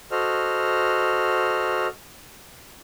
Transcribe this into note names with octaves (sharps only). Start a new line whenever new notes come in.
F#4 A4 C5 D#5 F6